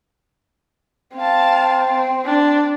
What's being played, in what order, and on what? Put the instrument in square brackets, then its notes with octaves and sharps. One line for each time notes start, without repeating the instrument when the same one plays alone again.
[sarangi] C4 [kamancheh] F5 A5
[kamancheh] D4